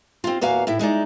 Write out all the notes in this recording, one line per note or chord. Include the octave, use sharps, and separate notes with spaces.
C4 F4
E2 A#2 A#3 F#4 F5 G#5
A2 E4
G#3 D#4 E4 D5